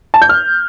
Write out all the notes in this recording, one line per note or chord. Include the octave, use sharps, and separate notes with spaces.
A5
G6
F6